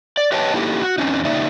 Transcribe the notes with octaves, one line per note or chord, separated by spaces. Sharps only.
D5
G4 B4 C#5 D#5 G5 A5
A#3 D#4 E4 G4 A4
F#4
E2 C4 C#4 D#4
C#3 A#3 D#4 D5 E5